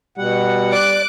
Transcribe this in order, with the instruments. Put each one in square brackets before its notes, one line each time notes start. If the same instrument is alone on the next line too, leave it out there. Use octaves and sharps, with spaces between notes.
[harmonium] B2 F#5 [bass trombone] G3
[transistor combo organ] D5 [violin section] D6 F#6 D7